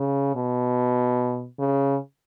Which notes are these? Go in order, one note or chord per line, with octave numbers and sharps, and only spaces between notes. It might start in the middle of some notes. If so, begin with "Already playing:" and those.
Already playing: C#3
B2
C#3